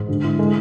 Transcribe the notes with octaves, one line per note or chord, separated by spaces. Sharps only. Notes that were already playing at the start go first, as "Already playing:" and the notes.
Already playing: G#2 G#3
D3
E4
G#3 A4